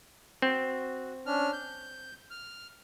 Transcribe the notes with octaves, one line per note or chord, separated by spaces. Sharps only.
C4 F#4
C#4 D4 F6
G6
F6